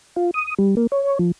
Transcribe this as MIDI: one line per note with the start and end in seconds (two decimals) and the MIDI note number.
0.16 0.31 65
0.34 0.54 87
0.59 0.75 55
0.77 0.87 58
0.92 1.18 73
1.19 1.32 53